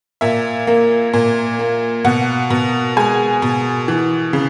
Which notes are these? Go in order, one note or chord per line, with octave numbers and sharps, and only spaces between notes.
A#2 E5
A#3
A#2
A#3
B2 F#5
B2
G#3 G#5
B2
E3
C#3